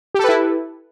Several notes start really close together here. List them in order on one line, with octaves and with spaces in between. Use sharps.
G4 A4 B4 E4